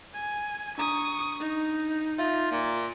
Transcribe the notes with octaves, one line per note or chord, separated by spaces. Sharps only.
G#5
D4 A#5 C#6 D#6
D#4
F4 E5 F5
A#2